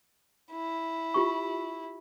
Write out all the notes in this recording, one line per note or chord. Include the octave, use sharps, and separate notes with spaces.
E4
F4 G4 C#6